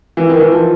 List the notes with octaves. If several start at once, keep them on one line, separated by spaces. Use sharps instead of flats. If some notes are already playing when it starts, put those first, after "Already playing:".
E3
D#3
E3
F3